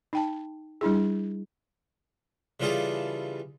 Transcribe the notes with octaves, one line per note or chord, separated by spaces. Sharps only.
D#4 G5 A5
G3 D4 E4 G#4
C#3 E3 G3 F4 G#4 A4